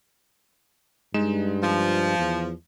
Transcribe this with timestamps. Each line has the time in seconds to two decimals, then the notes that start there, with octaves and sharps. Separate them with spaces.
1.14 G2 G#3 D#4 E7
1.63 F3
2.18 E2